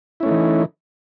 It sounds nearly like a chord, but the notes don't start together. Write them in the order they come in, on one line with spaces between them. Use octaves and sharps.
E4 C#4 A3 D#4 E3